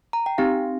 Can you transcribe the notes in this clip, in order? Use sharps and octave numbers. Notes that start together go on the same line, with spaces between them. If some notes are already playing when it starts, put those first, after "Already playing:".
A#5
G5
C4 D#4 G4 F5